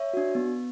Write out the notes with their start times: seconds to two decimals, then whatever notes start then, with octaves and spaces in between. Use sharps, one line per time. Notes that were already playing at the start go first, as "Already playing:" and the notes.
Already playing: C#5 E5
0.13 D4 F#4
0.35 B3